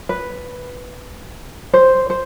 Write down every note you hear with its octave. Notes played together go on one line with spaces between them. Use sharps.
B4
C5
C5